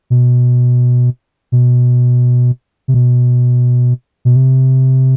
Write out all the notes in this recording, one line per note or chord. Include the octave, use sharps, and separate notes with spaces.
B2
B2
C3
B2
B2
C3